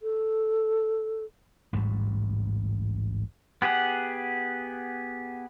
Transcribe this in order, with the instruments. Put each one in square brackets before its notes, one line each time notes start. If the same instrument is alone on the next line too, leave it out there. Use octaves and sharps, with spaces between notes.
[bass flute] A4
[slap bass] A1 D2 G#2 G3
[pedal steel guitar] B3 G4 G#4 F#5